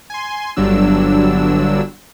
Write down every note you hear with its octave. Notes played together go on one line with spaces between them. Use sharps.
G#5 C6
G1 G2 D3 F#3 D4 E6